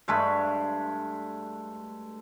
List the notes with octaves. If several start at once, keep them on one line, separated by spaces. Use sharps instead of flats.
G2 G#3 A3 B5